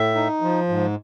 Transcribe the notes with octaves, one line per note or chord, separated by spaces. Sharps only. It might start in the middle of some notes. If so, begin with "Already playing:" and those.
Already playing: A2 E5
D#4
F3
G#2